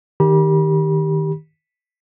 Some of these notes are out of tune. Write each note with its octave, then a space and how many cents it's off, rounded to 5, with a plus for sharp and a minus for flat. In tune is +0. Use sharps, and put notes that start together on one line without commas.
D#3 +0 G4 +5 B5 -40